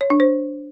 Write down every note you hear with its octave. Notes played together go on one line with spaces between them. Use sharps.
C#5
D4
C5